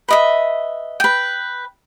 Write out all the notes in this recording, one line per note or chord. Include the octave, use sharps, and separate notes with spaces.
B4 D#5 E5
B4 G5